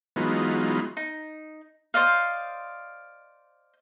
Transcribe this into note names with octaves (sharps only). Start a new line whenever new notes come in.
E3 F#3 G#3 B3 D#4 F4
D#4
C5 D5 D#5 F5